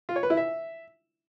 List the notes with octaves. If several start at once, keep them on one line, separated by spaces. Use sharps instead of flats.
F4
C#5
B4
E4
E5